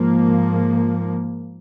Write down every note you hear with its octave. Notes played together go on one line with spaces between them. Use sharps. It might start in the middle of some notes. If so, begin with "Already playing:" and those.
Already playing: G#2 F3 A#3